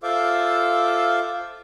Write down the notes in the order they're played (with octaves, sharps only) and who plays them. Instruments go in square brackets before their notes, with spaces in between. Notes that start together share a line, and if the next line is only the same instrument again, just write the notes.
[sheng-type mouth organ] F4 A4 C5 E5 F5 D6